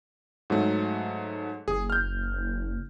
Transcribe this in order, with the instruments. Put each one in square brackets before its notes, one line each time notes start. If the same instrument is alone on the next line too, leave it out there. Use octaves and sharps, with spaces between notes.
[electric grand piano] G#2 F#3 A3
[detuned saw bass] F#1 [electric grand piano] G#4
[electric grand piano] F6 G6